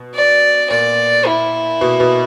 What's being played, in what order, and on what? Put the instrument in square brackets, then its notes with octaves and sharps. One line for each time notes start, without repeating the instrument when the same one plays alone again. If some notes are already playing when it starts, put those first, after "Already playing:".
Already playing: [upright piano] B2
[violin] D5
[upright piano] A#2 [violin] D5
[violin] E4
[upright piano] B2
B2